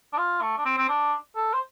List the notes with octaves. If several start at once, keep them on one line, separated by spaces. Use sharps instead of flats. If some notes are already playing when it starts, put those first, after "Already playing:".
D4
F4
A3
D4
C4
C4
D4
A4
C5